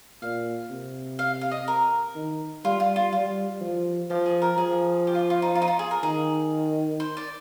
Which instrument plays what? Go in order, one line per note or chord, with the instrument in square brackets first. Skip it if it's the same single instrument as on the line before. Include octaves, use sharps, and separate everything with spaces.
[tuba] A#2 [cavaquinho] F5
[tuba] C3
[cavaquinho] F5
F5
D#5
A#4
[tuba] D#3
[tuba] G3 [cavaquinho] F4
[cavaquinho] F4
F4
[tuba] G3 [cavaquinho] F4
[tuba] F3
[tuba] F3 [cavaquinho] G4
[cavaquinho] G#4
A#4
[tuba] F3 [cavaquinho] G#4
[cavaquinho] G4
F4
G4
F4
D#4
F4
D#4
F4
G#4
A#4
[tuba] D#3 [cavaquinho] G#4
[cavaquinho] C5
D5